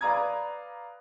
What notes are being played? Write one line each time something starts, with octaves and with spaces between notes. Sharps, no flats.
B4 D5 F5 A#5 D#6 G#6